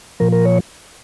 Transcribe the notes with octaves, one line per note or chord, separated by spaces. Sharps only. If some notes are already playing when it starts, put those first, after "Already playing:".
A#2 F3 A#4
A#4
C#5